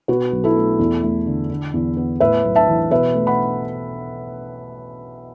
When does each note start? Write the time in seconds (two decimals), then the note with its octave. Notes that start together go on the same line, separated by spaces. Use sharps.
0.08 B2 F#4 B4
0.33 B1
0.44 E4 A4
0.56 A3
0.79 E2
1.03 A3
1.26 D3
1.50 D3
1.74 E2
1.97 B3
2.20 A2 B4 E5
2.45 B1
2.55 E5 A5
2.68 E3
2.91 B2 B4 E5
3.15 A3
3.27 F#5 B5